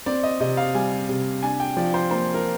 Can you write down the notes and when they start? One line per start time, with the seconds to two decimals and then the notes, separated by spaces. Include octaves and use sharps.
0.06 C4 D5
0.23 D#5
0.40 C3 D#5
0.57 F5
0.75 G3 G#5
1.09 C3
1.43 D4 G#5
1.60 G5
1.77 F3 D5
1.94 C5
2.11 A#3 C5
2.34 A#4